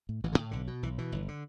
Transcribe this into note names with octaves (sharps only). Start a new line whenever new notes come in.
A2
A1 E3
D3
A2
B1 D3
B2
B1 E3
B2 E3
G1
D3